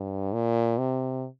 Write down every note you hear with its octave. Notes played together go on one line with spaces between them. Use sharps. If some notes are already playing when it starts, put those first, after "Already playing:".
Already playing: G2
A#2
C3